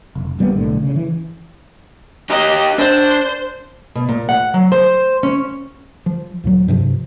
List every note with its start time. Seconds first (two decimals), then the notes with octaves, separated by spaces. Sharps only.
0.15 F1
0.39 A#1 G3 A#3 B3
0.55 B1 A2 D3
0.82 C#3
0.96 E3
2.30 D#4 G4 D#5
2.78 D4 C5
3.96 B2
4.09 A#2
4.29 F#5
4.54 F#3
4.72 C5
5.23 C#4
6.06 F3
6.44 D2 A#2 F#3
6.68 G2 C3 E3 F3